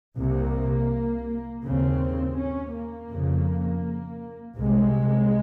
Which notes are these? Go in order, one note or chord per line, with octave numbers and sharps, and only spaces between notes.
C2 C3 A#3
D#2 C#3 C4
C#4
A#3
F2 C#3
C2 C3 G#3